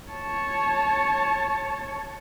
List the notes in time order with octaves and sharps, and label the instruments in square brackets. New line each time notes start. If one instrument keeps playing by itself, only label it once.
[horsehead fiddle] C#5 A5